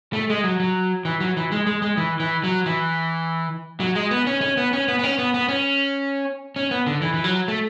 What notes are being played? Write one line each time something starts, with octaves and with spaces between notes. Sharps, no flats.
A3
G#3
F#3
F#3
E3
F#3
E3
G#3
G#3
G#3
E3
E3
F#3
E3
F#3
G#3
B3
C#4
C#4
B3
C#4
B3
B3
C#4
B3
B3
C#4
C#4
B3
D3
E3
E3
F#3
A3